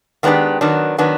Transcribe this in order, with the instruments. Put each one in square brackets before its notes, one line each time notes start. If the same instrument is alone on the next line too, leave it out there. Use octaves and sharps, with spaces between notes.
[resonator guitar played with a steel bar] D#3 G#3 B3 D4 G4
D#3 F#3 B3 D4
D#3 F#3 B3 D4